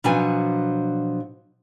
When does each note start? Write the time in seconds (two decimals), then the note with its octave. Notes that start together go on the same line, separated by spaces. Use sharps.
0.04 B2 F3 F#3 D4 F4 G#5